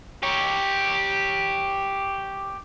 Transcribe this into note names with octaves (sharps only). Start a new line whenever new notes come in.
G4 C#5